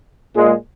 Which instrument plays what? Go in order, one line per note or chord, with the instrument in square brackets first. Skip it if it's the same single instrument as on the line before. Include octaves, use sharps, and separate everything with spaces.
[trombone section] A#2 G#3